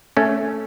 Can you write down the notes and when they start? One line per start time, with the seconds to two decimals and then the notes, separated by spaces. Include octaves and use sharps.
0.17 A3 C#4